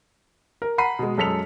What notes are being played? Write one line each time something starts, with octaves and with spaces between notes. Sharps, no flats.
A#4
F#5 A#5 B5 C7 D#7
B2 G#3
F#2 G#3 A4 B6 C#7 F7